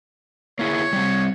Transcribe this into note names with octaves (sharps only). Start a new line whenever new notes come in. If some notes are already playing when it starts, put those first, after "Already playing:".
A#3 E4 G#4 C#5
G3 C4